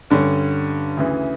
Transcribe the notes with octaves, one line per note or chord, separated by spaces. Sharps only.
G2 D3 G3 C#4
D2 C#3 E3